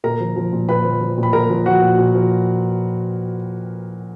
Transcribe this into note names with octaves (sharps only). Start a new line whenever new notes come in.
A#2 A#4 A#5
F3
F3
A#2
A#2 B4 B5
F3
F3
A#2
B5
A#2 A#4 A#5
F3
F3 F#4 F#5
A#2
A#2
F3